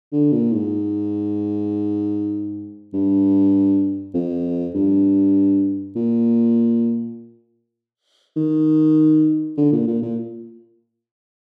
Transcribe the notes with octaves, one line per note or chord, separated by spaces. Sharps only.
D3
A#2
G#2
G2
F2
G2
A#2
D#3
D3
A#2
A#2
A#2